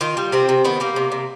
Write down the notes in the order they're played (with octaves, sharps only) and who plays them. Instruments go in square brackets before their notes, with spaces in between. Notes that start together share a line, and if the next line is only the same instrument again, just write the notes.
[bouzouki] D#3 F4
G3
C3 C4
C3
D#3 B3
G3 A#3
C3
C3